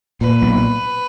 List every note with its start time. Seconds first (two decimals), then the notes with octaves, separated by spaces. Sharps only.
0.21 A#2 B4
0.42 B1